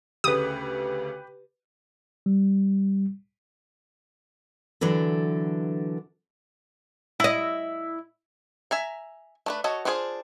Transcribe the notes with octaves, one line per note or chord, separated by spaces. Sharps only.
D2 C#3 A3 G4 B4 D#6
G3
D3 E3 F#3 D4 A4
E4 D#5
E5 G#5 A#5
A3 D4 B4
F#4 A4 C#5 D#5
B3 D4 F4 G#4 C5